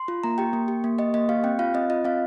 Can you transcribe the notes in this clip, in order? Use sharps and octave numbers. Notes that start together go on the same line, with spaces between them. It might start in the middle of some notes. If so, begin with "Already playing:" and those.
Already playing: C6
F4
A#3 A#5
G4 G5
A#3
G4
A#3
G4 D#5
A#3 D#5
G4 F5
C4 G5
F4 F5
C4 D#5
F4 D#5
C4 F5